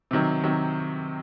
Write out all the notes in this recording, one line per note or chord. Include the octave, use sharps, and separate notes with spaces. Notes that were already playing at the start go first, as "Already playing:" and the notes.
C3 D#3 F#3
C3 D#3 F#3